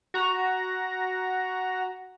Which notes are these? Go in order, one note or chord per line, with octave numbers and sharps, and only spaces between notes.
F#4 A#5